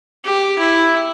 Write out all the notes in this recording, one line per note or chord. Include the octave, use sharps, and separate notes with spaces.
G4
E4